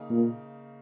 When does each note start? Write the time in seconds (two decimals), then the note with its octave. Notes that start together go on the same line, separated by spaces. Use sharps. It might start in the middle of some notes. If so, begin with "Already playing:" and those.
Already playing: C#3 A#3 D#4
0.10 A#2